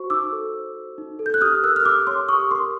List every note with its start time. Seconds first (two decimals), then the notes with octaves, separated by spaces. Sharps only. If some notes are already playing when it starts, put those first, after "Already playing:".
Already playing: F#4 C5 C#6
0.10 D#4 D6 E6
0.32 A4
0.54 C5
0.76 F#4
0.98 D#4
1.19 A4
1.26 G6
1.34 F#6
1.41 G4 D#6 F6
1.63 A#4 E6 F#6
1.76 F6
1.85 G4 D6 E6
2.07 C#5 C6 D6
2.29 G4 C#6 D#6
2.51 A#4 C6 D6